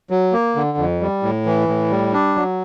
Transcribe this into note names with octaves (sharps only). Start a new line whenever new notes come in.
F#3
A#3
D3
F2
G3
A2
E3
A2
G3
D4
F#3